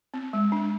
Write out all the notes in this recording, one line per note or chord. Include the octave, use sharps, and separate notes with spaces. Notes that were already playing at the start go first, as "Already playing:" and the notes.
C4
G#3
D4